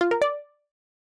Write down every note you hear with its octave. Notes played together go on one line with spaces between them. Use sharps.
F4
A#4
D5